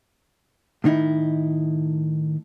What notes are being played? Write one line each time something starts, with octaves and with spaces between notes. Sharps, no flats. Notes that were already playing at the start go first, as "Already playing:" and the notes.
A2 D#3 D#4 E4